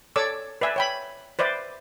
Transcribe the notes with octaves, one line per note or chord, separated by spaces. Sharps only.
A4 C#5 D5 D6 E6
B4 D5 E5 G#5
C#5 G5 B5
B4 C5 D5 E5